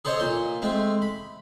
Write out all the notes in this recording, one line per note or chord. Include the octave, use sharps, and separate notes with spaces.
G#4 A4 C5 C#5 D#5
A#2 C6
G#3 A3 C4
B5